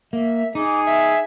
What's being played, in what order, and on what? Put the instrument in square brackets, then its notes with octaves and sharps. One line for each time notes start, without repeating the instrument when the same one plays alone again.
[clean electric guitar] A#3 [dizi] E5
[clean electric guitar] D#4 [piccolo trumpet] G#4 [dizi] D6
[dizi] E5